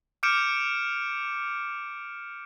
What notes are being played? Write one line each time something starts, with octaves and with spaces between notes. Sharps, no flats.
D6 F6 G6 C#7 D7 E7